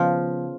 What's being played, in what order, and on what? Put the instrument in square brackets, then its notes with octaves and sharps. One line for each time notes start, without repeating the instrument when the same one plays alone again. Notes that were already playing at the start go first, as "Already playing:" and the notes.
Already playing: [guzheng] C#3 F3 B3 F4